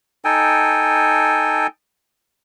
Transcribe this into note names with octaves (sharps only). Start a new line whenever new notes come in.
D#4 A4 G5 G#5